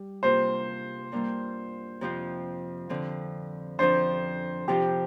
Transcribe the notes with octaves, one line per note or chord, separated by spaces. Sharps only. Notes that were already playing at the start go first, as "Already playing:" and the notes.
Already playing: G3
C3 A#3 F4 C5
G2 G3 A#3 F4
F2 C3 F3 C4 F4
D3 F3 C4
F2 F3 D4 C5
F2 C3 F3 D4 F4 G4